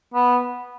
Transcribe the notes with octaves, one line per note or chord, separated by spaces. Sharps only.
B3